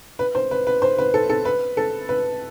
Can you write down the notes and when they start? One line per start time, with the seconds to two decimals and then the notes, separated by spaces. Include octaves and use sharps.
0.19 B4
0.35 C5
0.51 B4
0.67 B4
0.82 C5
0.98 B4
1.14 A4
1.29 A4
1.45 B4
1.77 A4
2.09 B4